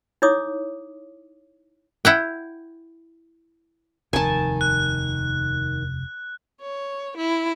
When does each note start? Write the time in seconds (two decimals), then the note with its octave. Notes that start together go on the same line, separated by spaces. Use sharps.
0.22 D#4 E4 C#5 D6 D#6
2.05 E4 F#5 G5
4.13 F1 D#2 D#3 G#5 A5
4.61 F#6
6.61 C#5
7.17 E4